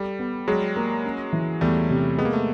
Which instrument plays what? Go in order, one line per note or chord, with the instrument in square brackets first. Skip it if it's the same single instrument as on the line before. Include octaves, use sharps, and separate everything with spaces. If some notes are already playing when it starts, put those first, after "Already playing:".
Already playing: [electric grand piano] G3 [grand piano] A4
[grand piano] B3
[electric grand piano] F#3 G#3 [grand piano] G#4
[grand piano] A#3
C#4
E3
[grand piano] E2 [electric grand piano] G3 A3
[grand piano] C3
[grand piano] G#3 [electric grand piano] B3
[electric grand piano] A#3
A3